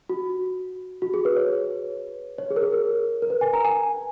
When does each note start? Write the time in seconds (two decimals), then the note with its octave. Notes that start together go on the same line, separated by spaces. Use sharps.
0.09 F#4
1.02 F#4
1.14 G#4
1.25 B4
1.37 C#5
2.38 C#5
2.50 G#4
2.56 A#4
2.62 G#4
2.73 A#4
3.22 A#4
3.30 B4
3.41 G#5
3.53 A#5
3.65 G#5